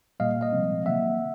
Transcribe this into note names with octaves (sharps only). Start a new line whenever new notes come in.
A#2 G3 A#3 D#5 F5
D#5 F5
C3 F3 G#3 C4
D#3 F#3 A#3 E5 F#5